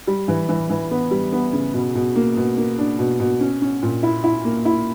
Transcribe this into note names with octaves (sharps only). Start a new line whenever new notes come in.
G3
E3
E3
E3
B3
G3
B3
C#3
B2
B2
A#3
B2
A#3
D4
B2
B2
C#4
C#4
A#2
E4
E4
A#3
E4